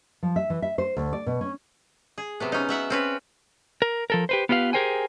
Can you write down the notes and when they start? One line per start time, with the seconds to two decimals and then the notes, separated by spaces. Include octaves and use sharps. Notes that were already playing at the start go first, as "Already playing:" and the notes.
0.23 F3
0.36 E5
0.50 E3
0.62 E5
0.78 C5
0.97 D2
1.13 D5
1.26 B2
1.41 C#4
2.18 G#4
2.40 C3 F#3 B3
2.52 C#4 D#4
2.69 F#3 E5 F#5
2.90 C4 C#4 B4
3.82 A#4
4.10 F3 A4 A#4
4.29 G4 B4 C5
4.49 B3 F4 G4 B4 F5
4.73 G4 G#4 A#4 C5 G5 G#5